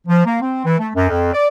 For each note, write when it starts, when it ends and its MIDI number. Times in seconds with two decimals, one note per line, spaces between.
0.07 0.25 53
0.26 0.41 58
0.41 0.65 60
0.65 0.78 52
0.79 0.89 57
0.95 1.07 42
1.08 1.30 41
1.33 1.48 74